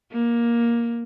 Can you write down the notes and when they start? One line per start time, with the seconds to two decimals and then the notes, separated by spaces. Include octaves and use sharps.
0.12 A#3